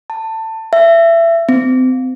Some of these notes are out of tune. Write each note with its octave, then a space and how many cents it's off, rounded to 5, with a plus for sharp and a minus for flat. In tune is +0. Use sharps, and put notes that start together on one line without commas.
A5 +20
E5 +25
C4 -30